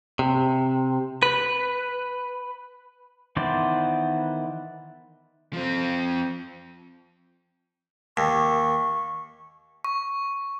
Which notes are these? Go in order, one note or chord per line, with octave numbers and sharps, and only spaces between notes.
C3
B4
D#3 E3 B3 C5 D5
F3 C4
D#2 C#6
C#6